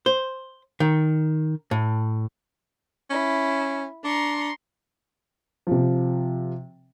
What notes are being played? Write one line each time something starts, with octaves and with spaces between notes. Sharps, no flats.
C5
D#3
A2
C#4 E4
D4 A#5 C6 C#6
C3 F3